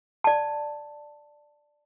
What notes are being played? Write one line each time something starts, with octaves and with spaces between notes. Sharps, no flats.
D5 A5